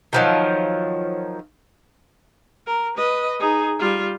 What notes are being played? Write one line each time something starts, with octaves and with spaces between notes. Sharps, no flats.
D#3 F3 F#3
A#4
B4 D#5
D#4 G#4
G3 F4